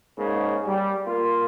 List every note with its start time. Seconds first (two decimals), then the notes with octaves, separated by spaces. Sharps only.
0.17 G#2 C#3 A#3
0.66 G3
1.06 A#3 F4